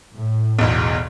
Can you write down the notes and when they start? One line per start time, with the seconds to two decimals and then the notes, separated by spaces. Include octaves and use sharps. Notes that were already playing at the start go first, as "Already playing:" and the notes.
0.14 A2
0.59 E1 B1 E2